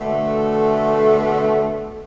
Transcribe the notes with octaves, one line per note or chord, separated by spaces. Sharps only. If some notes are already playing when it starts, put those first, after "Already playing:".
B2 D3 A3